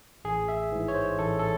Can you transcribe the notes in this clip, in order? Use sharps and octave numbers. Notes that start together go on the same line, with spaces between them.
A1 G#4
E5
G#2 E3
C#5
C5
A1 A4
A4